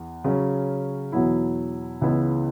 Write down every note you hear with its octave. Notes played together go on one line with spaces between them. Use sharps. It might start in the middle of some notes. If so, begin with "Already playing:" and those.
Already playing: E2
C#3 F#3 C#4
E2 B2 F#3 B3 E4
C#2 C#3 E3 B3 E4